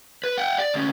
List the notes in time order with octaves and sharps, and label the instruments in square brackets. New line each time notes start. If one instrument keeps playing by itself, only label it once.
[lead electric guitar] B4
F#5 G5
D5
D2 C#4